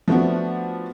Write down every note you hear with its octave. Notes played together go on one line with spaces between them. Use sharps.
F3 A3 B3 D4 F#4